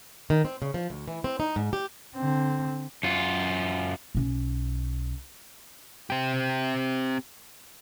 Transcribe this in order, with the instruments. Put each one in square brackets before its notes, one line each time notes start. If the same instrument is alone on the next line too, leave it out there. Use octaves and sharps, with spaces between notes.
[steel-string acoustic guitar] D#3
C4
C#3
F3
D2
E3
C4
D#4
G#2
G4
[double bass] D3 C4
[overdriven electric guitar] F#2 F4
[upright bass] B1 C#4
[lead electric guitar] C4 G4